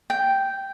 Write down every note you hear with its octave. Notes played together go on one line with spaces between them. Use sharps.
G5